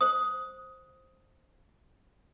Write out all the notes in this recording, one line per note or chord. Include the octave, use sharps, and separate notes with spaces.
C5 D#6